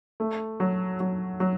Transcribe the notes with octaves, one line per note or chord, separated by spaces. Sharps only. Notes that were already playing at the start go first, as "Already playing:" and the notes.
A3
F#3
F#3
F#3